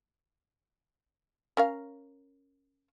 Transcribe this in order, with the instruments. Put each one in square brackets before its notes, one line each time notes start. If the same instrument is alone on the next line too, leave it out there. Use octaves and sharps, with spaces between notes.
[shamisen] C#4 A#4 F5